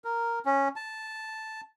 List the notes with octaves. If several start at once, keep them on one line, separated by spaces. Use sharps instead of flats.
A#4
C#4
A5